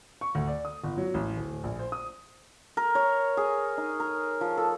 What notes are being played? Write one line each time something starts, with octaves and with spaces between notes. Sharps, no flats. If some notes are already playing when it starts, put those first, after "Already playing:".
C#6
D2
D5
D#6
G1
F#3
A1
D1
A#1
C5
D#6
A#4
C#5
G#4
D#4
A#4
F3
A4